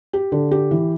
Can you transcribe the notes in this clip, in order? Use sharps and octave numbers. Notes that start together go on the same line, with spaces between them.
G4
D3
G4
E3